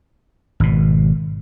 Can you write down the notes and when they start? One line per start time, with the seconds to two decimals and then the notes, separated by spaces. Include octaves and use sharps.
0.60 G#1 B2